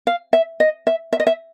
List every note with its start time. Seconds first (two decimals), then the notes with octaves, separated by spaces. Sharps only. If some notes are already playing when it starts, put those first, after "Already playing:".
0.07 F5
0.33 E5
0.60 D#5
0.87 E5
1.13 E5
1.20 D#5
1.27 E5